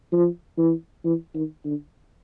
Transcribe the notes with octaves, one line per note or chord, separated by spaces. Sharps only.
F3
E3
E3
D#3
D3